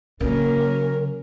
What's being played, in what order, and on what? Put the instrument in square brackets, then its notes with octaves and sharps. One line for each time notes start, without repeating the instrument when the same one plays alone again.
[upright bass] C#3 [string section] F#3 A#3 C#4 [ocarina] A#4